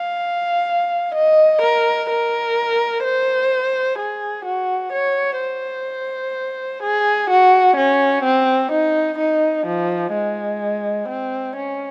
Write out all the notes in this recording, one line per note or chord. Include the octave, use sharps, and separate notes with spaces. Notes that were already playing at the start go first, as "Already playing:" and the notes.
Already playing: F5
D#5
A#4
A#4
C5
G#4
F#4
C#5
C5
G#4
F#4
C#4
C4
D#4
D#4
F3
G#3
C4
C#4